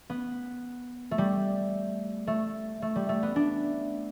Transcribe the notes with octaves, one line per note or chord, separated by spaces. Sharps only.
B3
A3
G3
A3
A3
G3
A3
B3
D4